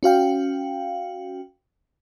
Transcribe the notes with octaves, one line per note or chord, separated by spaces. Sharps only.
C#4 F#4 F5 G5